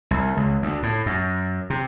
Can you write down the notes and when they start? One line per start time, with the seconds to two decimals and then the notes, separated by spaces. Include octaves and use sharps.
0.11 C2
0.37 C#2
0.62 D2
0.83 A2
1.06 F#2
1.70 C3